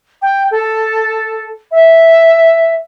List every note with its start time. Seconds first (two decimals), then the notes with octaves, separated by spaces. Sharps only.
0.22 G5
0.51 A4
1.71 E5